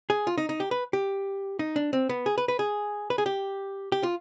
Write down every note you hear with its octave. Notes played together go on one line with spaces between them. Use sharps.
G#4
F4
D#4
D#4
G4
B4
G4
D#4
D4
C4
B3
G#4
B4
B4
G#4
B4
G#4
G4
G4
F4